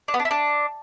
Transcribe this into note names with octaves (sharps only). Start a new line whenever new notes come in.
D4
B3
D4
E4
D4